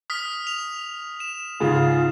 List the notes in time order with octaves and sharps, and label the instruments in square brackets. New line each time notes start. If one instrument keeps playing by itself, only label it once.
[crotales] D#6 F6 B6
F7
E7
[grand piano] G#2 C#3 [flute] F4